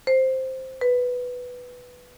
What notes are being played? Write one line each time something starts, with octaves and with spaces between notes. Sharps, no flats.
C5
B4